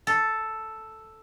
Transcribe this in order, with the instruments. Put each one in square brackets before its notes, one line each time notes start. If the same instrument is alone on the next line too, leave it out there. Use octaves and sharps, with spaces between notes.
[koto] A4